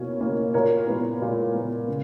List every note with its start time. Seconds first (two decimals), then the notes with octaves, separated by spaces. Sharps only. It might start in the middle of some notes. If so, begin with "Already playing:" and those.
Already playing: B2 A#3 C#4
0.21 A#3 C#4
0.54 A#2 A#4 C#5
0.87 G#3 B3
1.22 A#2
1.55 G#3 B3
1.88 C#3